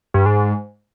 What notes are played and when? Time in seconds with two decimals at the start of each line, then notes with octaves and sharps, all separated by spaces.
0.14 G2
0.26 G#2